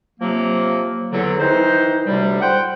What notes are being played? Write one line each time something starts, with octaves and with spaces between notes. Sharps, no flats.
C3 F3 F#3 A#3
E2 D3 F#3
D#3 E3 D#4 C5
D2 A2 C3 G3
C5 F#5 G5